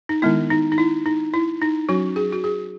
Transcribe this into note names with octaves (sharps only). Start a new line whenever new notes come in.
D#4
D#3 G#3 B3 E4
D#4
D#4
E4
D#4
E4
D#4
F#3 C#4 F#4
G#4
F#4
G#4